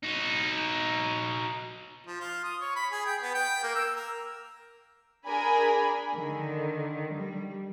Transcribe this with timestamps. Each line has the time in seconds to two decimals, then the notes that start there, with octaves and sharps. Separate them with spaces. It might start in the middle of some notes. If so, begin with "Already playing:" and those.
0.03 D#4 F#4
2.07 F3
2.20 F4
2.44 D#6
2.61 C#5
2.76 B5
2.92 G#4
3.06 G5
3.22 B3
3.35 G5
3.63 A#3
3.75 E6
3.96 A#4
5.26 D4 G#4 A#4 G#5 B5
6.13 D3 D#3
7.13 G3